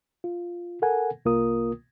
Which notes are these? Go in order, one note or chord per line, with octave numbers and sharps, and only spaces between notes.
F4
A4 A#4 F#5 G#5
C2 A#3 F4 A#4 D#6